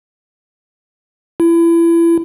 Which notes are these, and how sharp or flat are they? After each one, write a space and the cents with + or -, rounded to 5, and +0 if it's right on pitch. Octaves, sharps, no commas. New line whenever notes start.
E4 +30